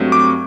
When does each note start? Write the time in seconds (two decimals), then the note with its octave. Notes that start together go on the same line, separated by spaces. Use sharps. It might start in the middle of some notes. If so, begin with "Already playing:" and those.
Already playing: G2 F#3 A3 C4
0.12 D6